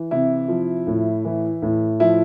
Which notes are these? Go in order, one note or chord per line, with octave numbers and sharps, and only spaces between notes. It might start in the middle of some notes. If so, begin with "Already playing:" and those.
Already playing: E3
C3 E4
F3
A2
E3
A2
F3 E4